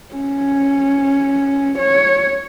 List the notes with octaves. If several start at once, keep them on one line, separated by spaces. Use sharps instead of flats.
C#4
C#5